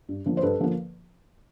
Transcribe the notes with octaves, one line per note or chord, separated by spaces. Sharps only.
G2
D3 F3 A#3
C5
G2 A4 B4
D3 F3 A#3